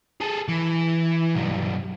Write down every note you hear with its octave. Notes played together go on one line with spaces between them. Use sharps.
G#4 A4
E3
B1 G2